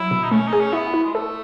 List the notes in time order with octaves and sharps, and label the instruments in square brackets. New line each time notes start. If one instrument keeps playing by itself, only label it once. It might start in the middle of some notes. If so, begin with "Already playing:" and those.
Already playing: [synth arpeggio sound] F#3 [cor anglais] E4
[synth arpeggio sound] B2
[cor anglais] D#4
[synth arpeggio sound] A3 [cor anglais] C#4
[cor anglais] D#4
[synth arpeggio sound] G#4
[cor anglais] C#4
[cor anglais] B3 [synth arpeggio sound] E4
[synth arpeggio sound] E4
[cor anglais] G#3
[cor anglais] A3 [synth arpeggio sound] A4